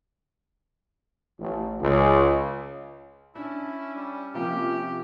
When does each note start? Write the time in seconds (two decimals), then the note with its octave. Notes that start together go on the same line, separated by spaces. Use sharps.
1.39 A1
1.81 C#2
3.35 C#4 D4 E4
3.95 G3
4.34 C3 F3 A#3 G4